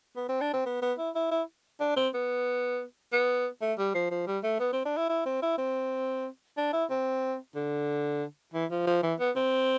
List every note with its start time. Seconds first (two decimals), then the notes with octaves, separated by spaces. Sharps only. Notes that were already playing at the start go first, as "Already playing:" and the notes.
0.16 B3
0.29 C4
0.41 D4
0.54 C4
0.66 B3
0.82 B3
0.99 E4
1.15 E4
1.31 E4
1.81 D4
1.97 C4
2.14 B3
3.13 B3
3.62 A3
3.79 G3
3.95 F3
4.11 F3
4.27 G3
4.44 A3
4.60 B3
4.73 C4
4.85 D4
4.97 E4
5.09 E4
5.26 C4
5.43 E4
5.58 C4
6.58 D4
6.73 E4
6.90 C4
7.55 D3
8.54 E3
8.71 F3
8.87 F3
9.03 E3
9.20 B3
9.36 C4